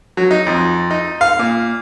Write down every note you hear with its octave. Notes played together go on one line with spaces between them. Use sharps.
F#3
D#4
F2
D#4
F5
A#2